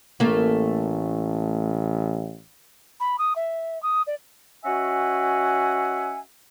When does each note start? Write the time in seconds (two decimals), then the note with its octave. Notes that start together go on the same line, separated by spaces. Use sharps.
0.20 A1 A3 A#3
3.00 B5
3.18 D#6
3.36 E5
3.83 D#6
4.07 D5
4.65 C#4 F#4 D#5 E5 F#5 G#5